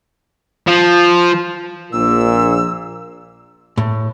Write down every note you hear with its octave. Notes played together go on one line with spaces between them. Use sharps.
F3
A#1 A#2 E6
A2